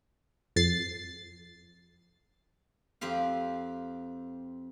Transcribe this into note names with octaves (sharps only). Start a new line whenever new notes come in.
F2 A6 C7
F2 C4 G4 F5